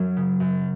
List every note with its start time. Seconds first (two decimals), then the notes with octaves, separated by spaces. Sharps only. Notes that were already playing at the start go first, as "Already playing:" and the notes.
Already playing: F#2 F#3
0.17 C#3
0.40 F#2